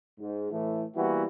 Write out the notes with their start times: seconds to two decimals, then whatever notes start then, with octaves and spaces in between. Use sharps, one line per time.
0.20 G#2
0.52 A2 E3 A3
0.96 E3 G3 A#3 B3 E4 F#4